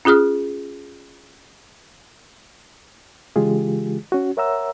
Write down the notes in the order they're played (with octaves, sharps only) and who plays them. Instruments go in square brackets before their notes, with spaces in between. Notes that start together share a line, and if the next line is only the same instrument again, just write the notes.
[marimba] C#4 F4 G#4 D#6 F6
[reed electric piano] C#3 E3 G#3 F4 G4 G#4
C#4 F#4
A#4 C#5 E5 F#5 A#5 E6